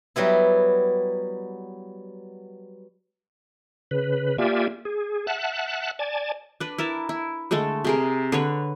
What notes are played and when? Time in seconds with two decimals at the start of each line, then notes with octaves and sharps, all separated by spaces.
0.16 F#3 G3 B3 E4
3.91 C#3 B4
4.38 A#3 F4 G4 D5 E5 G#5
4.85 G#4
5.27 E5 F#5 A5 F#6
5.99 D5 G#5 A5
6.60 D4 B4
6.78 E4 A#4 A5
7.09 E4
7.51 D3 G#3 A3 A4
7.84 C3 G#4 A#4
8.32 D3 B4 C#5